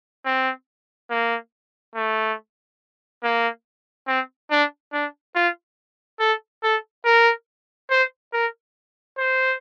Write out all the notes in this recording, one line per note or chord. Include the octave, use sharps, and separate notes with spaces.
C4
A#3
A3
A#3
C4
D4
D4
F4
A4
A4
A#4
C5
A#4
C5